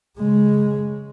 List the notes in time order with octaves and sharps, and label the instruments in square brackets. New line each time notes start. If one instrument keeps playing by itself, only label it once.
[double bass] C#3 G#3